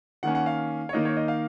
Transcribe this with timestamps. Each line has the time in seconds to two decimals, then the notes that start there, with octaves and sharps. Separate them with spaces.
0.23 D#3 A#3 C#4 F#5
0.35 F#5
0.46 F5
0.89 C#5
0.93 D#3 A#3 D#4 D#5
1.05 C#5
1.17 D#5
1.28 F5